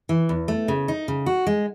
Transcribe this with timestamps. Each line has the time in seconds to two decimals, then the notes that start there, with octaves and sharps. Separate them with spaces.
0.09 E3
0.29 E2
0.48 A3
0.68 C#3
0.88 D#4
1.08 C#3
1.26 F#4
1.47 G#3